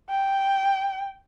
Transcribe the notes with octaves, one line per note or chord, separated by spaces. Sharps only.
G5